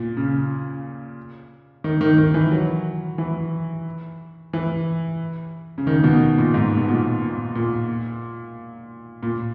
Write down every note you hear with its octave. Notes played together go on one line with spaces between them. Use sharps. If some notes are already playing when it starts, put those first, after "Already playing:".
Already playing: A#2
C#3
D#3
D#3
D#3
E3
F#3
E3
E3
C#3
D#3
B2
A#2
G#2
B2
A#2
A#2
A#2
A#2